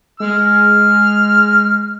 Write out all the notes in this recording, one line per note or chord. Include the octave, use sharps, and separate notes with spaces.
G#3 F6